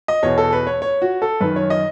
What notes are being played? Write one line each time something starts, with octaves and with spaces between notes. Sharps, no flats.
D#5
E2 B2 C#5
A4
B4
C#5
C#5
F#4
A4
F#2 D#3 B4
C#5
D#5